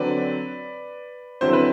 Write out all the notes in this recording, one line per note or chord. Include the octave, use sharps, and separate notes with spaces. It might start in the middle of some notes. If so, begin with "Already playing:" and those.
Already playing: D3 F#3 C4 B4 D5
D3 F#3 C4 E4 C5
B4